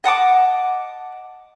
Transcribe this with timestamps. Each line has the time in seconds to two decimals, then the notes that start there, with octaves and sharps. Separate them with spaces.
0.04 D#5 F#5 A5 D6